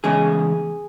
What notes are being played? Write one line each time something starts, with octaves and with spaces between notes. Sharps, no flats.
E2 C#3 G#3 G#4